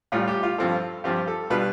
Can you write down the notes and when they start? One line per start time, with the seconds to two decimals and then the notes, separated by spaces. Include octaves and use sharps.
0.12 A1 A2 G3 F4
0.28 G4
0.43 F4
0.58 G2 F3 C4 F4 A4
1.04 G2 F3 C4 F4 G4
1.28 A4
1.50 B2 G3 D4 F4 B4